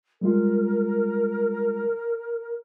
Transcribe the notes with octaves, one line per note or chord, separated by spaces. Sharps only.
G3 G#3 F4 A#4